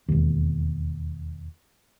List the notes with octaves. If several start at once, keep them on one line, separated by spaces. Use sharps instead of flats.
E1 D#2